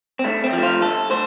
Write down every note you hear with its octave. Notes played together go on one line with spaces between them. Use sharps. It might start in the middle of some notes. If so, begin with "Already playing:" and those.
C4
G2 A3
C4
F3 A3
F4
G2 A4
A3 C5